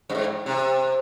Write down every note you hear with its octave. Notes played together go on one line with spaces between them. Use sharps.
G2
G#2
C3